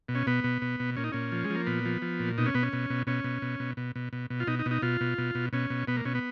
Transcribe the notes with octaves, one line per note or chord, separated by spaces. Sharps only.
B2
C#4
B2 B3
B2
B2
B2
A#2 C#4
D#4
A#2 C#4
F3
G#3
F3
A#3
A#2 B3
F3
F3
A#2
B2 D#4
C#4
B2 B3
C#4
B2
B2
B2 C#4
B2
B2
B2
B2
B2
B2
B2
F4
B2 D#4
D#4
B2
D#4
B2 F4
B2
B2
B2
B2 C#4
B2
B2 B3
A#3
B2 C#4
B3